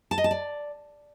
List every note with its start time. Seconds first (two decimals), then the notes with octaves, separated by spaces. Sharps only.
0.11 A5
0.18 D#5
0.24 A5
0.31 D5